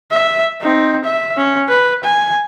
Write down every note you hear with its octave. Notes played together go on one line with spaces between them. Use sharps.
E5
C4 D#4
E5
C#4
B4
G#5